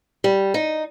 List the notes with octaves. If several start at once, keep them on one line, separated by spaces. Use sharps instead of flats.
G3
D#4